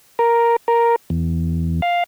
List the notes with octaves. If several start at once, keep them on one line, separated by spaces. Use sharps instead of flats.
A#4
A#4
E2
F5